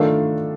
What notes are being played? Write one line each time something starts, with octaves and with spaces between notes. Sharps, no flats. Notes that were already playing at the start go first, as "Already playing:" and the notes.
Already playing: D#3 A3 D4 F4 A4